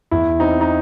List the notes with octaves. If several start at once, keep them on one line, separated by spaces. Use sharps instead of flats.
E2 E4
C4 D#4
D#4